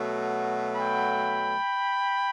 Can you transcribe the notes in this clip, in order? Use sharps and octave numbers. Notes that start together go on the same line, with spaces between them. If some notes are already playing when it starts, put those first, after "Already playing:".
Already playing: B2 F#3 A3
G5 B5